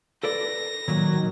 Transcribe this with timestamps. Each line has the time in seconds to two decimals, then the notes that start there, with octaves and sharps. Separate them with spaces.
0.23 A4 B4 D5 A#6
0.88 A#2 D#3 F#3